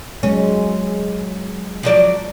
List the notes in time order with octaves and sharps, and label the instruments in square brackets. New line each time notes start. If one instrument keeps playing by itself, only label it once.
[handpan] F#3 G#3 [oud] C#4
[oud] F3 F#3 D5